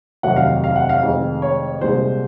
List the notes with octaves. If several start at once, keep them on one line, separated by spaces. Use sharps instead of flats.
F1 D#2 D#3 F#3 F#5
F5
F5
F#5
F5
F1 F2 D#3 G#3
C#5
C2 A#2 G#3 C5